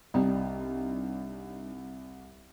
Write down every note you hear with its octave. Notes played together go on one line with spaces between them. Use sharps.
C2 G3 D4 D#4